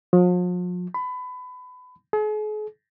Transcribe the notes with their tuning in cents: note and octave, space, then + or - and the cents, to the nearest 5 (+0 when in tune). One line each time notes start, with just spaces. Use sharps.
F3 +45
B5 +25
G#4 +45